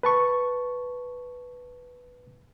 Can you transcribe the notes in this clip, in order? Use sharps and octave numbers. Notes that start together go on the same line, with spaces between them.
B4 A5 C#6